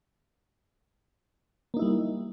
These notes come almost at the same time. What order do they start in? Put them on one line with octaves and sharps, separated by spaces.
A#3 D#4 E4 G3